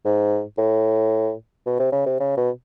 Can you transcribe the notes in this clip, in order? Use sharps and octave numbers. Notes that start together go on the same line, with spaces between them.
G#2
A2
B2
C3
C#3
C3
C#3
B2